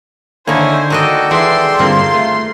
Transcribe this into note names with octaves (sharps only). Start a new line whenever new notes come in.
D3 D#3 A#3 E4 C5 C#5 G#5
D#3 F#4 A4 D5 D#5 G5
E3 G#3 E4 C6
G2 D3 A#3 C4 F4
A3